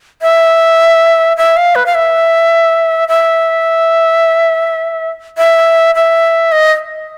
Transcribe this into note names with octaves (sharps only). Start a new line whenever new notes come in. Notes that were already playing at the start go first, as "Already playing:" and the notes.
E5
E5
F5
B4
F5
E5
E5
E5
E5
D#5